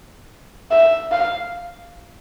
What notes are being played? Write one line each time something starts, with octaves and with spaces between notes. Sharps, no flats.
E5
F5